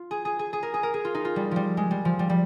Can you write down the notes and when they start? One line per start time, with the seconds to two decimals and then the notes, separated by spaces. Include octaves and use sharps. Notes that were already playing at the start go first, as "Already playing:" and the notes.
Already playing: F4
0.11 G#4
0.25 G#4
0.39 G#4
0.53 G#4
0.63 A#4
0.74 G#4
0.83 A#4
0.94 G#4
1.05 F4
1.14 D#4
1.25 F4
1.36 G3
1.51 F3 G3
1.77 G#3
1.91 G3
2.05 F3
2.19 G3
2.29 G3